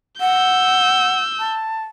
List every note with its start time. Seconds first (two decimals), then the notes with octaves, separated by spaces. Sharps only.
0.21 F#5 E6 G6
1.39 A5